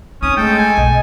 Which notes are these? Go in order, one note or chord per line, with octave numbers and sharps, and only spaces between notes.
C4 C#4 D#4 D#6
G#3 A3 A4 G5
G#5
B1 B2 D#5